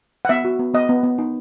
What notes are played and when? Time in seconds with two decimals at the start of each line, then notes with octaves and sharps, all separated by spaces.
0.25 F#5
0.29 B3 E5
0.45 F#4
0.59 B3
0.74 B3 D#5
0.89 B3
1.03 B3
1.18 D#4